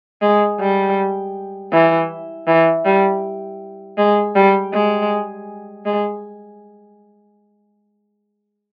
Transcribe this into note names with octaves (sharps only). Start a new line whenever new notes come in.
G#3
G3
E3
E3
G3
G#3
G3
G#3
G#3